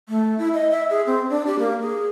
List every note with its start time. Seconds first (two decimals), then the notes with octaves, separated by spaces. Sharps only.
0.09 A3
0.39 E4
0.54 D#5
0.71 E5
0.90 G#4
1.07 C4
1.30 D4
1.47 G4
1.59 A#3
1.82 G#4